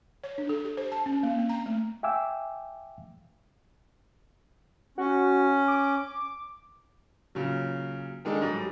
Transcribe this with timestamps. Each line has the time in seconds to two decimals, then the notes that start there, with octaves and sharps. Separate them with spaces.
0.24 C#5
0.38 D4
0.49 A4
0.65 G4
0.77 C5
0.92 A5
1.06 C#4
1.23 A#3
1.38 C4
1.49 A#5
1.66 A3
2.03 E5 F5 G5 G#5 D6 E6
4.98 C#4 F#4
5.68 D6
7.35 A#2 C#3 F#3
8.25 D#3 G#3 D4 D#4 A4
8.42 G#2 F#3 G3